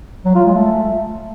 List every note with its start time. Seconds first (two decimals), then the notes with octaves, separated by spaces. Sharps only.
0.25 F#3
0.35 F4
0.45 G#3
0.55 A3